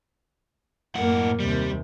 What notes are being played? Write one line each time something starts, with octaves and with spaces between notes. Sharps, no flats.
F#2 A2 A#3 F#5
D#2 C3 G3